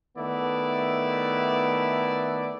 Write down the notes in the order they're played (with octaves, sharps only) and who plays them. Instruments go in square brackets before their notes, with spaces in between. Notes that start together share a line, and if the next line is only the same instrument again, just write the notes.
[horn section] D#3 A3 B3 E4 D5